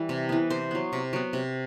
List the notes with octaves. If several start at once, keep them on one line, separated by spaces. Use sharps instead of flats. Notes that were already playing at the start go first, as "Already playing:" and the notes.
Already playing: E3 G3
C3
E3 B3
C3 C5
F#3 B3
C3
F#3 B3
C3